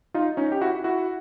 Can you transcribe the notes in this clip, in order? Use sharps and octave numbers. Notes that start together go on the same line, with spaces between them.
D#4 F4
C#4 D#4
G4
E4 F#4
E4 F#4